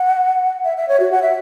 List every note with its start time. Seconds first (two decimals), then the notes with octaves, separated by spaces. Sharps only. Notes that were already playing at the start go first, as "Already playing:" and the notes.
Already playing: F#5
0.64 E5
0.77 E5
0.89 C#5
1.00 F#4
1.12 F#5
1.22 E5